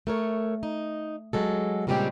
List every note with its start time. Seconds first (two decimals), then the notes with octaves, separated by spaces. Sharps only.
0.07 A3 A#4 C#5
0.63 D#4
1.33 F#3 G#3 A4
1.87 A#2 C#3 G3 G#3 C4 G4